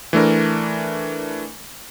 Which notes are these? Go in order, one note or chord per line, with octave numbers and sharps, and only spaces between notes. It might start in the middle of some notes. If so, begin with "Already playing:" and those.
E3 A3 D4 A#4